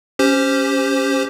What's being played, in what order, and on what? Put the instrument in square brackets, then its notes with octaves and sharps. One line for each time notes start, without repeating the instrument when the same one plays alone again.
[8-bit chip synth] C#4 G4 C5